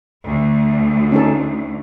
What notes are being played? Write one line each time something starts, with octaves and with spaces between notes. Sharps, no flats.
D2
C#4 D#4 A4